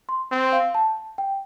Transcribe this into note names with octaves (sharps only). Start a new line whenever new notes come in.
C6
C4
F5
A5
G5